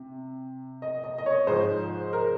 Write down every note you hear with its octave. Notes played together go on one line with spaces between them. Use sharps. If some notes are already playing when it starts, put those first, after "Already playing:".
Already playing: C3
D#5
D#5
D#5
C#5
G#2 F3 C5
A#4